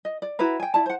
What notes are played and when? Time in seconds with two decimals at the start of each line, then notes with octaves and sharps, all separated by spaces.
0.05 D#5
0.22 D5
0.39 E4 F#4 B4 A#5
0.60 G5 G#5
0.74 E4 D5 A5
0.86 C5 F#5